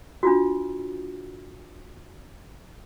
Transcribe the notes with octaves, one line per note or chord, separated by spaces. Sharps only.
D4 F4 F#4